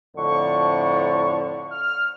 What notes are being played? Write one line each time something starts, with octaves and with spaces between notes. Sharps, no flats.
F2 A2 D3 C#6
F6